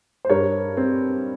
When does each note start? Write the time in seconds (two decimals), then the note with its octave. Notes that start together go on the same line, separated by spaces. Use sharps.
0.25 C5
0.30 G2 A#4 C#5
0.77 C4